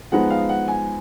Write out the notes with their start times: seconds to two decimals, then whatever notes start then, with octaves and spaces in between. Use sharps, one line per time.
0.12 F3 G#3 B3 D#4 F#5
0.30 F5
0.49 F#5
0.68 G#5